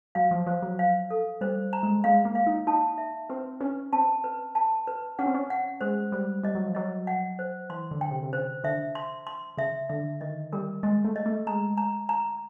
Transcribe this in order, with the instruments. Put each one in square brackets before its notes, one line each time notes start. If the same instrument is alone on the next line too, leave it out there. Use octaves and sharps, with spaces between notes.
[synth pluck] F#3 [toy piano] F5
[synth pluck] F3
[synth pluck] F3 [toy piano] C5
[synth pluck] F#3
[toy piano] F5
A4
[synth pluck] G3 [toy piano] C5
[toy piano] A#5
[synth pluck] G#3
[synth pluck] G#3 [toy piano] F5
[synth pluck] A#3
[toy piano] F5
[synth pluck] D#4
[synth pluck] D#4 [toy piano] A5
[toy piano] E5
[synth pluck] C4 [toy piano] B4
[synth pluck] C#4 [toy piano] B4
[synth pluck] C4 [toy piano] A5
[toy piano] B4
A5
B4
[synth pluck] C#4 [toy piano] F#5
[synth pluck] C4
C#4
[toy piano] F#5
[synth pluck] G#3 [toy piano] C5
[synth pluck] G3 [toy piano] C5
[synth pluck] G3 [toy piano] D#5
[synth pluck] F#3
F3
[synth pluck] F#3 [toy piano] D#5
[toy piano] F#5
C5
[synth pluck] E3 [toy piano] C6
[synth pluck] D3
[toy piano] G5
[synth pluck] C3
C3
[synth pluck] C#3 [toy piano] C5
[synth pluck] D3 [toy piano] E5
[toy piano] C6
C6
[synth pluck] C#3 [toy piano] E5
[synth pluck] D3 [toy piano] E5
[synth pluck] D#3 [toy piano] D#5
[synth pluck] G3 [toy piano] A#4
[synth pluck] G#3 [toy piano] D#5
[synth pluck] A3
[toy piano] D#5
[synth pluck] A3
[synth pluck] G#3 [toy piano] A#5
[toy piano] A#5
A#5